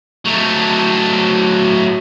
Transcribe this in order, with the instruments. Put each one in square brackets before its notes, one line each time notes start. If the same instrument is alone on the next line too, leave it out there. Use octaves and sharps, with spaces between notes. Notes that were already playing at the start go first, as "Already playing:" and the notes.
[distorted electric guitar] F#3 A3